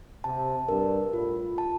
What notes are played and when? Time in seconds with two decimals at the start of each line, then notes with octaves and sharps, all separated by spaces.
0.24 C3 A5
0.69 G2 A#4
1.13 A2 F4
1.58 A5